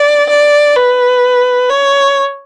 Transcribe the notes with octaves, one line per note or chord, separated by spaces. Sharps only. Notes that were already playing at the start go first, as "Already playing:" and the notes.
Already playing: D5
D5
B4
C#5